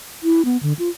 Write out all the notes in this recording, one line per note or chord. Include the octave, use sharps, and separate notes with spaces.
E4
B3
D3
F4